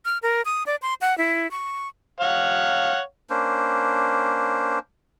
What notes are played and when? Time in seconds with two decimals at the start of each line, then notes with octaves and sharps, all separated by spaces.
0.05 F6
0.23 A#4
0.45 D#6
0.66 D5
0.82 C6
1.01 F#5
1.18 E4
1.51 C#6
2.21 C#5 F5 F#5
3.30 A#3 C#4 D4 C5